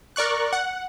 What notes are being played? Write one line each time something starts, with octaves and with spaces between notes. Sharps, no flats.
A#4 D5 C#6 F#6
F#5